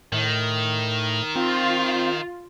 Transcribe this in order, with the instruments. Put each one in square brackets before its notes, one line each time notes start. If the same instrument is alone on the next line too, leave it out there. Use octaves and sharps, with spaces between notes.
[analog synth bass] A2 [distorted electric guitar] D#3
[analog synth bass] C4 [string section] F4